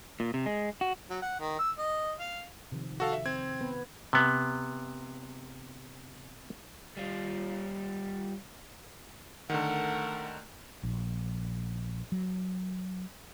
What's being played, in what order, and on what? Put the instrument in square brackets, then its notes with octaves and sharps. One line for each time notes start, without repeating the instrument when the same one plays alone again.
[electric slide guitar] A#2
C3
G#3
F#4
[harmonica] F#3
F#5
D#3
E6
D#5
F5
[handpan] C3 D#3 F3
[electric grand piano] F#4 A4 F5
E5
C4 G#6
[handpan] B3 B4
[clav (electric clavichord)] C3 B3
[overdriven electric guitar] G3 F4
[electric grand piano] D3 D#3 [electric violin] A3 A#4 [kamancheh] F#5
[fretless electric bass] A#1
F#3